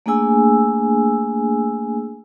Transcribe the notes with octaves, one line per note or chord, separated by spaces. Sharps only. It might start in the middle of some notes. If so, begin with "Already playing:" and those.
A3 A#3 D4 G#4 G#5 E6